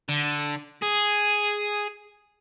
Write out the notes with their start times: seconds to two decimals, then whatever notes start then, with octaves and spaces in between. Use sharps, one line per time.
0.09 D3
0.82 G#4